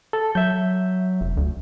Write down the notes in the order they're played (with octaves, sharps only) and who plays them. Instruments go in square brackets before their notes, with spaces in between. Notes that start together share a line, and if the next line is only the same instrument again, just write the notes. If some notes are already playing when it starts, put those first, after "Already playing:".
[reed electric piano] A4
[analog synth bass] F#3 [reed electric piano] E5 G6
[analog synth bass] F1
D2